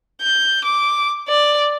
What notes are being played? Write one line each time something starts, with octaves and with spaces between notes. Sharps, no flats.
G6
D6
D5